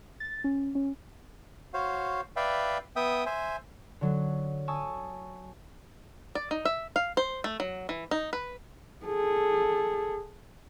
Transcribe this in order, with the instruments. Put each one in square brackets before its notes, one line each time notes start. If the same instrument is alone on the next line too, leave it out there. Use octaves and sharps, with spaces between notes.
[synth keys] A6
C#4
C#4
[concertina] F#4 C5 C#5 F5
B4 D5 E5 F5 G5
B3 E5 G5 D#6
C5 E5 G#5
[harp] D3 F#3
G#5 A5 C#6 D#6 E6
[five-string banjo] D5
D#4
E5
F5
C5
A3
F#3
E3
D#4
B4
[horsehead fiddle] G#4 A4